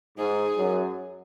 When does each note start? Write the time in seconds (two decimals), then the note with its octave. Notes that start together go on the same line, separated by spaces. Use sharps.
0.18 G#2 G#4
0.57 F#2